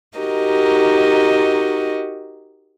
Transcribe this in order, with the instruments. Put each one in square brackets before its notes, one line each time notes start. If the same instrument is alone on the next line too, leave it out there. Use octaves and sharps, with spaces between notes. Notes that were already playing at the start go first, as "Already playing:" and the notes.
[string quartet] D#4 F#4 G4 A#4 D#5